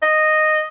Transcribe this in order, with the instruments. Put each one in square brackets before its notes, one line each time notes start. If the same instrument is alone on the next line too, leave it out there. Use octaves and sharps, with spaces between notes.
[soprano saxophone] D#5